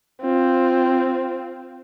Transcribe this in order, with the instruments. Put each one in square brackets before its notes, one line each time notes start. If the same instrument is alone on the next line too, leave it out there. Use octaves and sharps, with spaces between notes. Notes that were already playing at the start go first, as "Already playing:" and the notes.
[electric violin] C4 F4